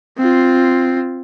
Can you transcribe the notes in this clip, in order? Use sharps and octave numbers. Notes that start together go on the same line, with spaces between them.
C4 F4